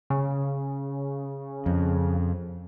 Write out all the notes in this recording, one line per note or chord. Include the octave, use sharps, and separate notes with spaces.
C#3
F2